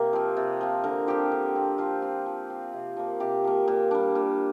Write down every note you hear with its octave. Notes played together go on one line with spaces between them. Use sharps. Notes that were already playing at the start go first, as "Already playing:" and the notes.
Already playing: C3 A#3 G4 A#4
F3 C4
C3
F3 C4
D3 A#4
F3 C4 G4
D3
F3 C4
F3 F4
C4
F3
C4
C3
F3 A#3
C3 G4
F3 A#3
A#2
G3 D4
A#2